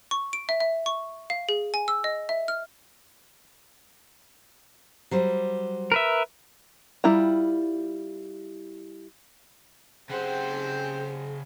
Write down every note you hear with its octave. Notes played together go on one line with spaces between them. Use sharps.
C#6
D7
E5
E5
C#6
F5
G#4
G#5
E6
D#5
E5
F6
F#3 G3 C5
A#4 B4 E5
G3 E4 F4 A#5
C#3 C4 G4 G#4 C5 F#5 G5